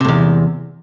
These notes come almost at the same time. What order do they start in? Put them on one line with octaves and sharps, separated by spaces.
C3 A2 E2